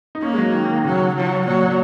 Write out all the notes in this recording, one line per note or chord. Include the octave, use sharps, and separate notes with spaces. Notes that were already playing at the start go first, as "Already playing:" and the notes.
D#4
A#3 C#4
G#3
F#3
D#3
D#3
C#3 F#3
F#3
A#2 F#3
A#2